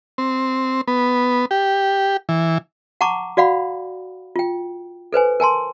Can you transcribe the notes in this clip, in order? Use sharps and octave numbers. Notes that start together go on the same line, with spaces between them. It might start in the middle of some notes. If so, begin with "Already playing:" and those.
C4
B3
G4
E3
F#5 A5 A#5 C#6 D6
F#4 D5 F5 F#5 B5
F4 G5
A4 B4 C5 G#5
A#4 G#5 A5 C6